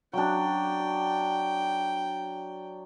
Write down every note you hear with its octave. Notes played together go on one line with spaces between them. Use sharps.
F#3 D4 G5